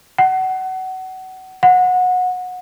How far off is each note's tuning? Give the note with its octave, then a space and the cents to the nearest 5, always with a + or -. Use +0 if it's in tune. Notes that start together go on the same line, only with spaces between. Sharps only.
F#5 +25
F#5 -20